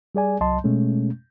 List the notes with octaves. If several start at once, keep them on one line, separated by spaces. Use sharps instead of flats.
G3 G#4 D5 G#5
C2 F#3 D#5 A5 C6
B2 G#3 A3 C#4